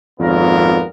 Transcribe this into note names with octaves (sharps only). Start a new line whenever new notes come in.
G#1 F2 A#2 B3 A#4